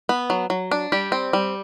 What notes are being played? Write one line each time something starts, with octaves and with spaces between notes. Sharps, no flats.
B3
F#3
F#3
D4
G3 G4
C4
G3